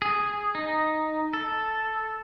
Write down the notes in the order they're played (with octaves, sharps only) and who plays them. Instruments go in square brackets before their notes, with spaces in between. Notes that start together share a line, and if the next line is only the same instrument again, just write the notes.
[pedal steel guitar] G#4
D#4
A4